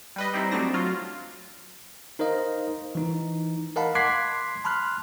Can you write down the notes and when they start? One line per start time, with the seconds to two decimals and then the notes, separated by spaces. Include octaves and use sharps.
0.16 G3 B4 D#5
0.34 G3 C4 D#4 E4
0.51 F#3 A3 C4 D4 A#6
0.74 F#3 F4
2.19 D#4 A#4 C5 D#5 F5
2.95 E3 D#4
3.76 A#4 D#5 F5 F#5 A5 B5
3.95 C6 D6 F#6 G#6 B6 C7
4.64 A5 B5 C6 F6 F#6